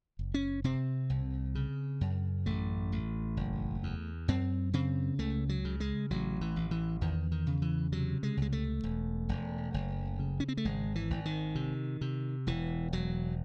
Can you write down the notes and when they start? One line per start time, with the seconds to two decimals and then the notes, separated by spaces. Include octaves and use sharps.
0.19 F#1
0.34 C#4
0.64 C3 C4
1.10 C2
1.55 C#3
2.01 F#2
2.46 A1 A3
2.92 A1
3.37 F#1
3.83 E2
4.28 F#2 C4
4.74 C#3 C4
5.19 C#2 A3
5.49 F#3
5.65 C#3
5.80 G#3
6.10 A1 F#3
6.41 E3
6.56 A1
6.71 E3
7.01 E2 D#3
7.32 D#3
7.47 C#3
7.62 E3
7.92 C3 F#3
8.23 G#3
8.37 C#2 G#3
8.52 A3
8.84 E1
9.29 E1
9.74 F#1
10.19 C#3
10.40 C#4
10.48 C4
10.57 A3
10.65 G#1 G#3
10.95 E3
11.10 G#1
11.25 D#3
11.55 C3
12.01 C3
12.47 E1 E3
12.92 E1 F#3